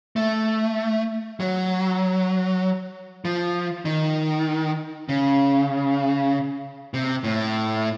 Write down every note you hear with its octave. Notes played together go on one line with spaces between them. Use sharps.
A3
F#3
F3
D#3
C#3
C3
A2